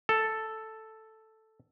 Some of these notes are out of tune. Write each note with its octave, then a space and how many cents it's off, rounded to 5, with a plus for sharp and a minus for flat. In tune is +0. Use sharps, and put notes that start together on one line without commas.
A4 +0